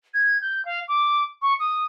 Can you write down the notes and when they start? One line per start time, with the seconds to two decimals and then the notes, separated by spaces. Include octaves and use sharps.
0.14 G#6
0.41 G6
0.65 F5
0.88 D6
1.42 C#6
1.60 D#6